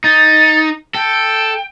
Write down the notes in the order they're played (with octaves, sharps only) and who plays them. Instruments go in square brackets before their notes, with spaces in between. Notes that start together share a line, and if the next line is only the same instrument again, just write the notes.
[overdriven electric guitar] D#4 [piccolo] A6
[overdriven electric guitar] A4 [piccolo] G5